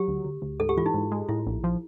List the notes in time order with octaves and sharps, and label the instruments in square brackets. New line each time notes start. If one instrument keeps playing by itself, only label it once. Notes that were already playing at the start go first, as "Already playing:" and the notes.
Already playing: [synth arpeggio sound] F#3 [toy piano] G4
[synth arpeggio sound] D2
D2
D2
[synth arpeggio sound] G#2 [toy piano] A4
[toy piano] G4
[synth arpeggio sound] E3 [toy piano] F4
[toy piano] D#4
[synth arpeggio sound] G#2
G#3
[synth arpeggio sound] A2 [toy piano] E4
[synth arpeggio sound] A#1
F3